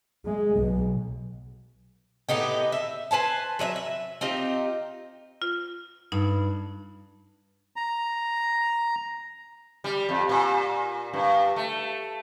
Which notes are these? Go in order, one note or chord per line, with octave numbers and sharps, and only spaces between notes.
G#3
B1 B2
A2 B3 D#4 G4
E5
B4 C5 G#5 A5
F#3 B4 D#5 E5
E5
C4 D#4 F4 G4
F4
G2 D#4
A#5
G3
F2
A#2
G2
A3